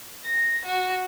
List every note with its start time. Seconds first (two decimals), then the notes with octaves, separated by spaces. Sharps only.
0.23 A#6
0.65 F#4